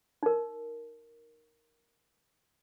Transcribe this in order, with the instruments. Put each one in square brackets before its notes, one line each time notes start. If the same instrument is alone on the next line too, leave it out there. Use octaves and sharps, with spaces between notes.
[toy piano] D#4 A#4